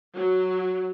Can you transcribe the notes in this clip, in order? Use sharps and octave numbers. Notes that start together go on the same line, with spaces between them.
F#3